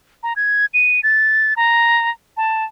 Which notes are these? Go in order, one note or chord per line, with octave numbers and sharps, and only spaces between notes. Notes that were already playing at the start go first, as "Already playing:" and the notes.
A#5
G#6
D#7
A6
A#5
A5